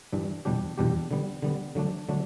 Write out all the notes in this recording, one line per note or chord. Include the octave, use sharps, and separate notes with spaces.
G2 E3 G3 D4
E2 B2 G3 D4 G4
E2 B2 G3 D4 G4
D3 G3 B3
D3 G3 B3
D3 F#3 A3 D4
D3 F#3 A3 D4